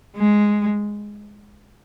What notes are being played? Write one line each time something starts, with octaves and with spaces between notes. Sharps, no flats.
G#3